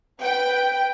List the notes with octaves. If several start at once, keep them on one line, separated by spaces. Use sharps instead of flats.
B4 G5